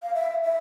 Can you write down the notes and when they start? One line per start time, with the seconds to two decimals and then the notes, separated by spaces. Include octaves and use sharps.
0.03 F5
0.14 E5
0.44 E5